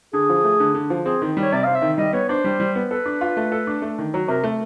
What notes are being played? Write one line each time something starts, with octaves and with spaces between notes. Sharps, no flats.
D3 G#4
F3
A3
D3
D3
F3
C4 G#4
D#3
G3
C#5
C3 D5
C4 F5
E5
D#3
G3 D#5
B3 C#5
D4 C5
G3
G3
B3
A4 B4
D4
F4
A3
A4
D4
A3
D#3
F#3
C3 A#4
A3